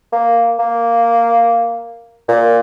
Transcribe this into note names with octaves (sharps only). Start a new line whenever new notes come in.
A#3
A#3
A#2